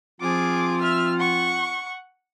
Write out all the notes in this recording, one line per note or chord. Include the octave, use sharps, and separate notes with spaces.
F3 C4 F4 G#4 D6
E5 F6
F#5 C#6